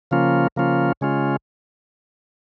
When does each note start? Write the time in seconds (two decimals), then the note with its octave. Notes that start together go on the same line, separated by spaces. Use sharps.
0.11 C#3 F3 A#3 C#4 F4
0.56 C#3 F3 A#3 C#4 F4
1.01 C#3 G#3 C#4 F4